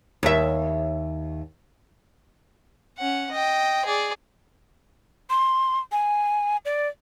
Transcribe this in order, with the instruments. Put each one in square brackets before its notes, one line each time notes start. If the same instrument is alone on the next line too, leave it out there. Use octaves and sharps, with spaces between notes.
[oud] D#2 E5
[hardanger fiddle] C#4 F#5
D#5 G5
G#4 D5
[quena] C6
G#5
D5